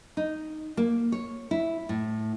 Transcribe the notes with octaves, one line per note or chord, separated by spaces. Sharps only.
D#4
A#3
C#5
E4
A2